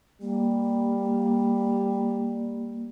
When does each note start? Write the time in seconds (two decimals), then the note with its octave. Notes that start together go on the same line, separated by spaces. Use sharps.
0.21 G3 A#3